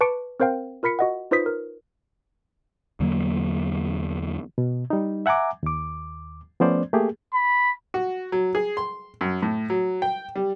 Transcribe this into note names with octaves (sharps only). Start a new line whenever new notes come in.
B4 A5 C#6 D6 C#7 D7
C4 A#4 C5 F5 G5
F4 A#4 B5 B6 C#7
F#4 D#5 F#5
D#4 F4 B4 C5 D#6 B6
A#4
E2 D3 F#3 A#3
B2
G3 D#4
E5 F#5 G#5 A#5 D6
D#2 D6
F3 A3 B3 C#4 C5 D5
A3 A#3 G4 G#4
B5
F#4
F#3
G#4
C6
F#2
A2
F#3
G5
G3